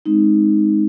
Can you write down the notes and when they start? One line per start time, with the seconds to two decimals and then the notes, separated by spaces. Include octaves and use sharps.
0.06 G#3 C4 D#4